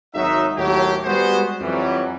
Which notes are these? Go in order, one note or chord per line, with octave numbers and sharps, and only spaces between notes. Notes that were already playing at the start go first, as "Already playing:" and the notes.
G#1 F#3 D#4 E5
D#2 A2 F#3 G4
G3 G#3 B3 F#4 G#4 C5
F2 E3 F#3 G3